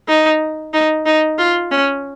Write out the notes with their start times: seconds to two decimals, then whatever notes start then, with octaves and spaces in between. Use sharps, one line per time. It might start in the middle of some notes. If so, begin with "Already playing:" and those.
0.09 D#4
0.73 D#4
1.06 D#4
1.38 F4
1.71 C#4